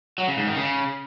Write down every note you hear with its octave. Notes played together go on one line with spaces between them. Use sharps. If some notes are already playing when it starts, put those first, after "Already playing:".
F#3
C#3
G#2
D#3
C#3